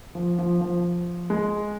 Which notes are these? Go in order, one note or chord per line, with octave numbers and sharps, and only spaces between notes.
F3
F3
F3
G#3